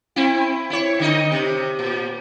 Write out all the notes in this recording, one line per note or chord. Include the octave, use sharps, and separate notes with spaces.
C4 E4
E4 C#5
D3 D#4 D#5
C3
A#2